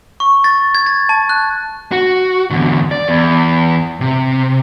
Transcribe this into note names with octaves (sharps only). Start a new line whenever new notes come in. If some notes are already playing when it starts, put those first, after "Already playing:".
C#6
A6
G#6
A6
A5
F#6
F#4
E2 D3
D5
E2
C3